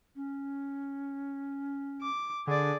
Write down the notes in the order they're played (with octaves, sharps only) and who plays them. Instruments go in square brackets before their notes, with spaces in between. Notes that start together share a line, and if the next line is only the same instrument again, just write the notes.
[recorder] C#4
[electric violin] D6
[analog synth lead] D3 [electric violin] G#4 D5